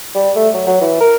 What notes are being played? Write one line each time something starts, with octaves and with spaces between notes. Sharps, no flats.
G3
A3
F#3
F#3
E3
A#4